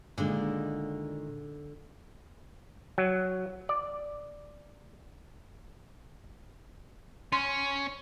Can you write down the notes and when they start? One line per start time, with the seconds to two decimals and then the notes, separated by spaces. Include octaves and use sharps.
0.18 A#2 D3 D#3 G#3
2.98 F#3
3.69 D5
7.33 C#4 C6